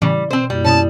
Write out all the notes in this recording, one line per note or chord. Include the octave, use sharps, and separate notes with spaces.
A2 C#3 E3 G3
B2 C4 C5
F#2 G3 A#3 E4
B2 C#4 E4 A5 D#6